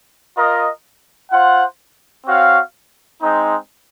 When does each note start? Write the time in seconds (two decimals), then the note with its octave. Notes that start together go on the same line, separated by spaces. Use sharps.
0.36 F4 A#4 D#5
1.31 F4 C5 F#5
2.26 C4 F#4 C#5 F5
3.22 G#3 C4 D#4